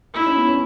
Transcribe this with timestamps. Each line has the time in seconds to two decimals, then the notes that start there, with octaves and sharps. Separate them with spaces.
0.14 D#4 E4
0.26 C#4
0.37 B3
0.48 C#4